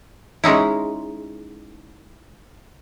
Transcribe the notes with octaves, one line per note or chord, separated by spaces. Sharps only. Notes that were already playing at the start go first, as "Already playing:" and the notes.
G#3 C#4 D#4 E4